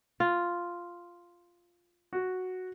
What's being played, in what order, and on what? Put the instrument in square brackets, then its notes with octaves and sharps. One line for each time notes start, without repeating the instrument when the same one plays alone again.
[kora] F4
[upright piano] F#4